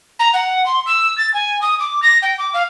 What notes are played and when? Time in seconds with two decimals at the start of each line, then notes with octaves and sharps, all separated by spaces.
0.19 A#5
0.33 F#5
0.66 C6
0.86 E6
1.18 A6
1.34 G#5
1.61 D#6
1.80 D6
2.02 A#6
2.22 G5
2.38 D6
2.54 F5